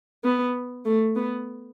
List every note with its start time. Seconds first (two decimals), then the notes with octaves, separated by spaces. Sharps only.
0.24 B3
0.85 A3
1.16 B3